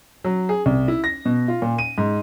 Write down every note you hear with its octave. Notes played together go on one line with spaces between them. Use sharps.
F#3
G#4
C2
E4
A#6
B2
F4
A#2
D#7
G#2